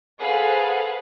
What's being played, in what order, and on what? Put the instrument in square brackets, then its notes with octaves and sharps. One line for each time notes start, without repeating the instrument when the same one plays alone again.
[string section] G#4 A4 B4 C5 F5 F#5